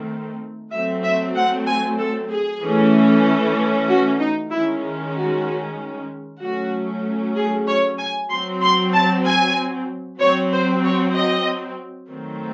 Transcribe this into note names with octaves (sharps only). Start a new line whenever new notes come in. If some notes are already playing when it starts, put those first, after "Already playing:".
Already playing: D#3 A3 C4
F#3 A3 C4 E5
E5
F#5
G#5
A4
G#4
E3 A3 C#4
F#4
D#4
D#3 G#3 C#4 E4
F#4
F#3 A3 C#4 F#4
G#4
C#5
G#5
F#3 C4 C6
C6
A5
G#5
F#3 C4 C#5
C5
C#5
D#5
D#3 F#3 A3 C4